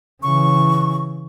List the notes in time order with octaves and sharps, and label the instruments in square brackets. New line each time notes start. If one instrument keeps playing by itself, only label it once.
[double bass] C#3 E3 [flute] C#6